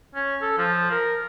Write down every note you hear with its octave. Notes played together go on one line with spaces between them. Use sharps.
C#4
A4
F3
A#4